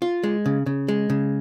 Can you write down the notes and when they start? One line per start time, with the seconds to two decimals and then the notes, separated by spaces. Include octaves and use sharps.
0.02 F4
0.24 G#3
0.46 C#3
0.66 C#3
0.88 G#3
1.10 C#3